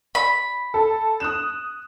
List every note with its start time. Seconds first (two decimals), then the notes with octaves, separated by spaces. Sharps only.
0.15 B5
0.74 A4
1.20 D#6 F#6 E7